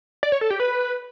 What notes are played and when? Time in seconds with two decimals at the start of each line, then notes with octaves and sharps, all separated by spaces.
0.23 D5
0.32 C#5
0.41 A4
0.50 G4
0.60 B4